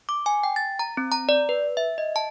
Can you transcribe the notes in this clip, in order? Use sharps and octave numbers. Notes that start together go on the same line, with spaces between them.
D6
G#5
G5
A6
A#5
C4
A#5
D5
B4
E5
D#5
A5